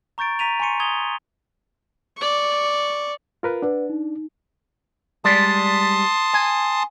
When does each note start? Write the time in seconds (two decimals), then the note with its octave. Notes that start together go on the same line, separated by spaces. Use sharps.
0.18 A#5 C#6 G6 A6 D7
0.39 A#5 B6 D#7 F7
0.60 G#5 A#5 C6 C#6 C#7 D#7
0.80 D#6 G#6 F7 G7
2.17 D5 C#6
3.43 F4 A#4 B4
3.62 D4 B4 D5 F#5
3.90 D#4
5.25 G3 G#3 D5 A5 C6 D#6
6.34 G#5